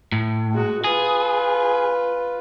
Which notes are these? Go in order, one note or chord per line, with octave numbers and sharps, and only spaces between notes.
A2
G#3 F#4
F4 G#4 B4